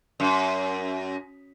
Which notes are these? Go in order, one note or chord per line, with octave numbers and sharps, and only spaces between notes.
F#2